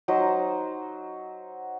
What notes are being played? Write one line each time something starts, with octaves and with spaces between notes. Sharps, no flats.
F#3 D#4 C5